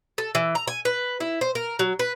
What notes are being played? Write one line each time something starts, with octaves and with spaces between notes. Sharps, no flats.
A4
E3
A#5
G#5
B4
E4
C5
A#4
F#3
B4